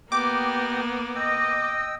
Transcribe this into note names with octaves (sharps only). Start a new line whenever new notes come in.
A#3 B3 G4 D#5 G5 D6
D#5 G5 E6